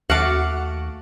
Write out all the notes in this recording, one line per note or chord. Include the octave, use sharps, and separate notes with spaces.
D#2 A3 F#4 F5 F#5 D6